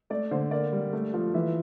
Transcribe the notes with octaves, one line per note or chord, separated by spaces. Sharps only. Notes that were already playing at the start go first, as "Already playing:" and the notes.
A3 D5
D3 C5
A#3 D5
G3
A3
F3
E3 E5